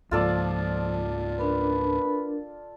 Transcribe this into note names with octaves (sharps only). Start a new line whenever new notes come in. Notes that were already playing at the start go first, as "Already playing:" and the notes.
C#2 G#2 F3 A#3 F4 A4 D5
D4 A#4 B4